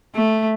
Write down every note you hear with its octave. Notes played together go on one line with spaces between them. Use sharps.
A3